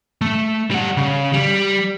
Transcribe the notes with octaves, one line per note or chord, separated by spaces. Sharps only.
A3
G3 F#5
C#3
G3